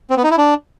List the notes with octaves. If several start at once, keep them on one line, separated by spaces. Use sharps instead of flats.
C4
B3
D#4
E4
D4